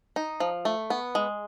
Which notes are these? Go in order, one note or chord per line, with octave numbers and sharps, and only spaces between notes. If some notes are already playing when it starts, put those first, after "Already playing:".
D#4
F3
A3
B3
G#3